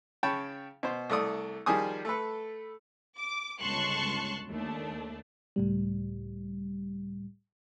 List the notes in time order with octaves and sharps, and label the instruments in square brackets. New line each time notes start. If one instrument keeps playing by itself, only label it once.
[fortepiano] C#3 C#5 G5 A5 B5
B2 C5
C2 A3 D5 D#6
D#3 F3 G3 G#4 G#5 D#6
A3 A4 B4
[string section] D6
G1 C#2 A5 C6 C#6 F#6
D#2 A3 D4
[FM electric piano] C#2 A2 G3